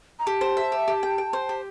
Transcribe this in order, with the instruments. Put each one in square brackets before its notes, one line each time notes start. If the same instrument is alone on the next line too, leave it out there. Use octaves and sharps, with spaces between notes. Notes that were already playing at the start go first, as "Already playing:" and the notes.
[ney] A#5
[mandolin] G4 [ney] A5
[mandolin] C5
E5
G4
G4
G5
G5
C5
G4